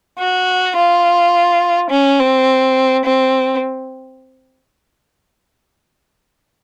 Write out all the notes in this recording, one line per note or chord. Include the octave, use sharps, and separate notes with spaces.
F#4
F4
C#4
C4
C4